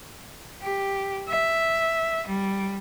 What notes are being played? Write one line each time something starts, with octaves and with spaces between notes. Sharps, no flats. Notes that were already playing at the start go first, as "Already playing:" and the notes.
G4
E5
G3